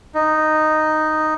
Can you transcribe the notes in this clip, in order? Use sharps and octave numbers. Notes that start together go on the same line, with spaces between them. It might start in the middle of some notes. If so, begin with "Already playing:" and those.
D#4